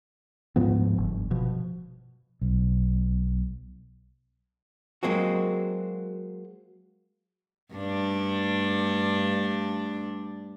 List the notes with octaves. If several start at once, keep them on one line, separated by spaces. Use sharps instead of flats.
D2 G#2 F3 B3
G1
B2 F3
B1
F#3 G#3 A#3 C4 F#4
G2 A3 D4